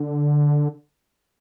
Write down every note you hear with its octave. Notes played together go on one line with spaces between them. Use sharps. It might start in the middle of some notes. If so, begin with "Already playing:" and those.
Already playing: D3